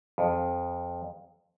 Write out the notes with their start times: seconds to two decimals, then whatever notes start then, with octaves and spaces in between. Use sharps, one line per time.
0.18 F2